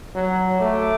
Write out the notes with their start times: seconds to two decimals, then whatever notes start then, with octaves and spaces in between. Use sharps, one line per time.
0.15 F#3
0.60 A3 D6